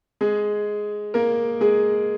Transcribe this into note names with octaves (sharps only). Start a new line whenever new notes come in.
G#3 G#4
A#3 A#4
G#3 G#4